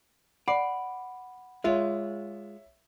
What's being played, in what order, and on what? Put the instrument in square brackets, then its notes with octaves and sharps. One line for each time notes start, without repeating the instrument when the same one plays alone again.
[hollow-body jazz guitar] D5 [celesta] F#5 B5 D6 [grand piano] C7
[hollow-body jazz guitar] G#3 F4 [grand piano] C#5 E5